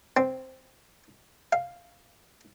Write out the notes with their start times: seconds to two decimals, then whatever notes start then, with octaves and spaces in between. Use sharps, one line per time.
0.17 C4
1.53 F5